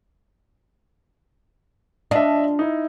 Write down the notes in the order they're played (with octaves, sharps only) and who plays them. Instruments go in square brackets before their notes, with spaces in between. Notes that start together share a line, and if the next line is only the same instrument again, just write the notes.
[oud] D4 F4 [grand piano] D#5 E5
[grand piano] D#4 E4